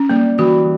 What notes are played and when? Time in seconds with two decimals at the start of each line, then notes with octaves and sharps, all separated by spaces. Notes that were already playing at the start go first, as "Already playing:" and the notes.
Already playing: C#4
0.09 G3 A#3
0.38 E3 F#4